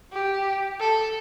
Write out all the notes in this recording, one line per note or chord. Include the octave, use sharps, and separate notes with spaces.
G4
A4